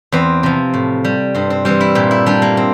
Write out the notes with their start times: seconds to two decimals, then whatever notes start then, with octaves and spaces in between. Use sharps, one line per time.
0.12 E2 C4
0.43 C3 F3
0.74 A2
1.05 G3
1.34 G2 C4
1.50 C4
1.65 E3 G3 C4
1.81 E4
1.95 A#2 G4
2.11 E4
2.26 G3 D4
2.42 A#3
2.57 C4